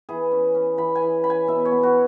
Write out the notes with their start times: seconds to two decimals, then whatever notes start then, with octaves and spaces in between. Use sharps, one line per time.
0.09 E3 G#4
0.32 C#4
0.55 C#4
0.78 E3 B5
0.95 G#5
1.02 E3
1.24 C#4 B5
1.30 G#5
1.47 B2 E5
1.65 C#5
1.71 B3
1.83 F#4